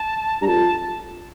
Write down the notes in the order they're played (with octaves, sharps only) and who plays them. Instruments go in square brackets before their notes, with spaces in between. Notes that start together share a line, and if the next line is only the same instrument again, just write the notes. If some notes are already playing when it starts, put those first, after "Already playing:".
Already playing: [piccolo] A5
[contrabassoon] G2 [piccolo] A#5
[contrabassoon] F2 [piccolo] A5